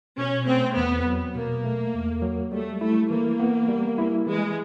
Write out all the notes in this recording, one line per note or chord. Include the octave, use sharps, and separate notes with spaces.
B2 C#4
A3 C4
E2 B3
F#3
B2 A#3
A3
E2
F#3
G3 A3
A3 E4
E3 A#3
B3
G3
E4
E3 G#3